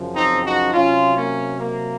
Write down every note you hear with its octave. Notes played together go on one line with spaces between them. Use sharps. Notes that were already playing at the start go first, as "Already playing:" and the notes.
Already playing: F#2 C#3 F3
C4 D#4
D#4 F#4
C3 F#3 C#4 F4
A#3 C#4
A#3